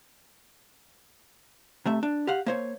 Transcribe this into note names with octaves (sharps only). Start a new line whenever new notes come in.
C3 A3 E5
D4
G4 F5 F#5
A#3 C5 C#5